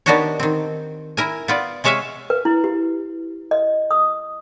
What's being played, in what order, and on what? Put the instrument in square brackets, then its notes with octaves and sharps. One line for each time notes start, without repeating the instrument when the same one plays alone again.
[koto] D#3 B3 D4 F#4 G4 C#5
D#3 C4
E4 A#4 G#5
B3 F4 D5
C3 G#3 C#5 E5 F5 G#5
[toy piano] B4
E4
G4
D#5
D#6